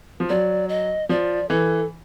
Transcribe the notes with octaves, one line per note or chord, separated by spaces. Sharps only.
F3
F#3 D5
D#5
F3 D5
E3 A4